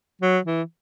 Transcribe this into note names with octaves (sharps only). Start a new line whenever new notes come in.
F#3
E3